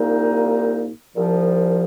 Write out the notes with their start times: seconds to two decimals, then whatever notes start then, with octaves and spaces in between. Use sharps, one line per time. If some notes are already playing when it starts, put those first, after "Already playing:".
Already playing: C2 A#2 A#3 D#4
1.14 C2 A#2 F3